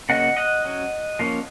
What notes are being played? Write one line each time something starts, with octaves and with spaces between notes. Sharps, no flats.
C#3 F#3 A#3 C#4 D#5 F#5
D#5 F#5
F#3 C#4
F3 A#3 C#4